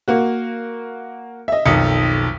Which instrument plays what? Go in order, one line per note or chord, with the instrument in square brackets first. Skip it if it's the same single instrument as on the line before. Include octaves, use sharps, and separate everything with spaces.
[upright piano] A#3 F#4
D#5 E5
[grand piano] B1 F2 D#3 [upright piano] D#6 C#7